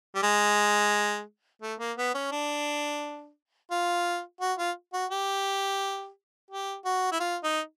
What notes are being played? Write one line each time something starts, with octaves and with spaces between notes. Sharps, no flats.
G3
G#3
A3
A#3
B3
C#4
D4
F4
F#4
F4
F#4
G4
G4
F#4
E4
F4
D#4